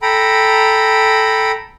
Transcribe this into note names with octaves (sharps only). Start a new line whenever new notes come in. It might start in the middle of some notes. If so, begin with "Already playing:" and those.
A4 G5 A#5 B5